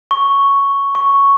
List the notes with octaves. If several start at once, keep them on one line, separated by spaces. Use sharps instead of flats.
C#6
C#6